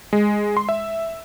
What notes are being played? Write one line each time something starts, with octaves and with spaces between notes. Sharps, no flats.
G#3
C6
E5